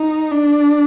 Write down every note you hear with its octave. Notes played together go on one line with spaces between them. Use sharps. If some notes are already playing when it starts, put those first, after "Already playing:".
Already playing: D#4
D4